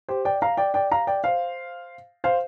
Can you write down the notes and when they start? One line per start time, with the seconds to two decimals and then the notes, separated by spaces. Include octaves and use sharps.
0.09 G4 C5
0.25 D5 G5
0.42 F5 A#5
0.57 D5 G5
0.74 D5 G5
0.92 F5 A#5
1.07 D5 G5
1.24 C5 F5
2.24 C5 F5